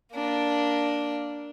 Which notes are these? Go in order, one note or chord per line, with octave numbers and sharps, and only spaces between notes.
A#3 D4